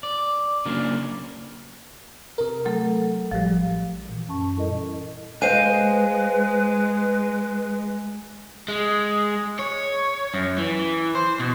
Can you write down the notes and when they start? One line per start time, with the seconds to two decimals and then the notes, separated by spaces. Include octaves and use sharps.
0.03 D5
0.65 C#3 F#3 A#3 D4
2.38 C3 A#4
2.65 F#3 A3 A4
3.31 A1 F3 G3
4.09 A#2 E3
4.28 F#2 C#4 A5 C#6
4.56 G3 E4 A4 A#4 D#5
5.42 G#3 B4 C5 D#5 F5 G#5 D#7
8.68 G#3
9.59 C#5
10.34 F#2
10.58 E3
11.15 C5
11.40 B2